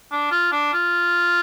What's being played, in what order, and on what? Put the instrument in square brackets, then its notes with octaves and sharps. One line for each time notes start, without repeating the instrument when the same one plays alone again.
[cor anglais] D4
F4
D4
F4